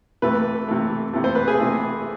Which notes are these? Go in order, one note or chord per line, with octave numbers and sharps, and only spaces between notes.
C3 E3 A3 B4
C3 E3 A3
C3 E3 A3
C5
B4
G#4
C3 E3 A3